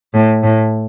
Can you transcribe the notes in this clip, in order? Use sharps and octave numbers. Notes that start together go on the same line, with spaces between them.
A2
A2